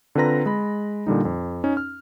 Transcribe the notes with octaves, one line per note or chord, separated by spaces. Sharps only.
D3 C4 F4 B4 A#5 A#6
G#3 B5
A#2 D3 G3 D#4
F2
C#4 D#4
F6